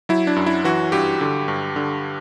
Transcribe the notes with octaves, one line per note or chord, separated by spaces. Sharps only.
F#3 E4
D4
F#2
E4
E3 F#4
G2 G4
D3
G2
D3